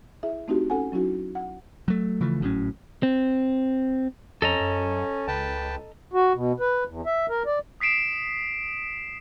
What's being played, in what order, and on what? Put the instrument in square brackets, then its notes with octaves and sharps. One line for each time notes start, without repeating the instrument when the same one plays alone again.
[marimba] E4 G#4 E5
A3 C4 D#4 E4 F#4 G4
C#4 A4 F#5 G#5
F#3 C#4 D#4 E4 F#4
F#5
[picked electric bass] F#3 A3
C#3 E3 F3 A3
G#1 A2 F#3 C#4
[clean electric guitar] C4
[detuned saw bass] F2 [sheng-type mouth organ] C#4 [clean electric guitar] A4 D#5 A#5
[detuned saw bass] F#2
[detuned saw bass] C#2 [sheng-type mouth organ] B4 G5 A5
[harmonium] F#4
B2
B4
E2
E5
A#4
D5
[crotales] D#6 B6 C7 D7 E7